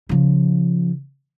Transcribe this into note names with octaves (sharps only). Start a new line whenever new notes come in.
C#3 F3